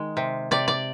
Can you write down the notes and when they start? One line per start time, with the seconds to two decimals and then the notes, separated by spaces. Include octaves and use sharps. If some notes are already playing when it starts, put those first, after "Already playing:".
Already playing: D#3 G#3
0.17 C3
0.51 C3 D5
0.68 D5